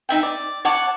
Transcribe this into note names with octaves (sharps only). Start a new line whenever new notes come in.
D#4 E5 G5
D5
C#5 F#5 A5 D6